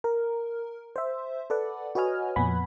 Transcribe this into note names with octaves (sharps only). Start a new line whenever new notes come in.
A#4
C5 E5
A4 B4 D5 F#5
F#4 B4 C#5 D#5 G#5 F6
F2 A#2 B3 F#5 G#5 B5